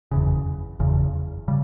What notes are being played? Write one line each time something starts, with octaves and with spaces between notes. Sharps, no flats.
F#1 E2 C#3
F#1 E2 C#3
C#3 G3